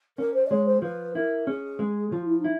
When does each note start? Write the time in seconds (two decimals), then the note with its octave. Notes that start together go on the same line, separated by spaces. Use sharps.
0.18 C#4 A#4
0.34 C5
0.46 D5
0.50 G#3 C#5
0.66 C5
0.82 F3 B4
1.14 E4 A#4
1.47 C#4 G#4
1.79 G#3
2.12 F3 F4
2.25 E4
2.39 D#4
2.44 E4